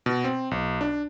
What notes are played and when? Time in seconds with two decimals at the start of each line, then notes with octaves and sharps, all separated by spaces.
0.06 B2
0.24 C4
0.51 B1
0.81 D4